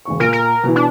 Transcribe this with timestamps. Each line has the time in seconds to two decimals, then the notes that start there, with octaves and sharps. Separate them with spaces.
0.05 E1 C#3 C#6
0.20 A#2 A#4 D7
0.33 A#4
0.64 B2 E3
0.76 D4